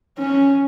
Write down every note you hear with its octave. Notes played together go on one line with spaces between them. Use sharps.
C#4